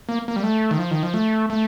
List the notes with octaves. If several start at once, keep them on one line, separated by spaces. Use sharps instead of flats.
A#3
A#3
G3
A3
D#3
F3
D#3
F3
A3
A3